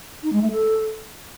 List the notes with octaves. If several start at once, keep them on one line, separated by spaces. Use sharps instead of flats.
D#4
G#3
A3
A4